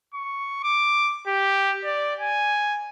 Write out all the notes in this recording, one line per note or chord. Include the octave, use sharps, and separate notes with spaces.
C#6
D6
G4
D5
G#5